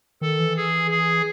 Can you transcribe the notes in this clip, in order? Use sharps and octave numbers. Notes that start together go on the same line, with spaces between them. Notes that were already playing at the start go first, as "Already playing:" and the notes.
D#3 A4
E3
G#4
G#4